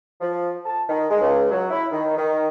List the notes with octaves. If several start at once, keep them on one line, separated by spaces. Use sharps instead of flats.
F3
A5
D#3
G#3
C#2
F#3
E4
D#3
D#3